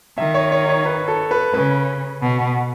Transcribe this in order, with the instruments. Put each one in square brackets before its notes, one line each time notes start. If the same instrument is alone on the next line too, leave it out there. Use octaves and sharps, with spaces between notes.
[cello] D#3 [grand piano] E5
[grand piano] C#5
C#5
C#5
B4
A4
B4
[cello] C#3 [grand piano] B4
[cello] B2